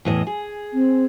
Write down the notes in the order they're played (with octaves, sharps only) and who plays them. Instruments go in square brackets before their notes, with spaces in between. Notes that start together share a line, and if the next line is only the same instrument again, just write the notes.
[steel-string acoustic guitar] E2 A2 D#5
G#4
[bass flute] C4